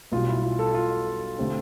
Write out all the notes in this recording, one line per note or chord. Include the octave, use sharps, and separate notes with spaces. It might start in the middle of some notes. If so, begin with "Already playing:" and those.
B1 B2 G3 F4
E4
F4
A4
F4
D3 A3 C4 G4